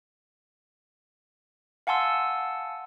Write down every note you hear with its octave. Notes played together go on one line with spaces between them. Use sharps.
F5 F#5 G#5 A5 C6 E6